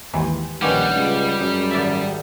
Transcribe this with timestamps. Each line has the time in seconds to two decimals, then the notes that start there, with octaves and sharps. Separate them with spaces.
0.13 G#1 D#2 E3 G4 G#5 C6
0.62 A#1 D#3 G3 C#4 G4 B4 F5 F#5
0.96 C#2
1.40 F#2 G#3
1.71 G#1 D5 E5 A5